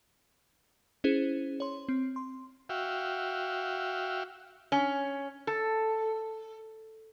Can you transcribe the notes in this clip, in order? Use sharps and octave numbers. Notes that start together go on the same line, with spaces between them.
C#4 E4 G#4 C5
C#5 C6
C4
C6
F#4 E5 F5 G5
C#4
A4